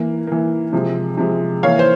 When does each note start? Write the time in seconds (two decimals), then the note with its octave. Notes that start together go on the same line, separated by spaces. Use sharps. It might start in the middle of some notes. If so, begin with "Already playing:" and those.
Already playing: E3 A#3
0.27 E3 A#3
0.73 C3 F3 G#3
1.18 C3 F3 G#3
1.63 E3 A#3 C#5 F5
1.79 C5